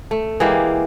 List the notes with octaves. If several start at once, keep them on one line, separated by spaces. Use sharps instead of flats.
A3
E3 G#3 A#3 G4